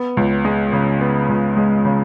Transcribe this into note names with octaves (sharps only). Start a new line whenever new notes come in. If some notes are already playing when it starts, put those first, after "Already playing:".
Already playing: B3
C#2
G#3
C#3
B3
C#2
G#3
C#3